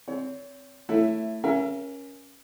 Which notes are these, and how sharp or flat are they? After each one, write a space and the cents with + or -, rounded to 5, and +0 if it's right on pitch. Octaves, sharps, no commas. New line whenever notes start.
C4 +0 C#5 +35
A3 +15 E4 +5 C#5 +0
C#4 +0 A#4 +25 E5 +35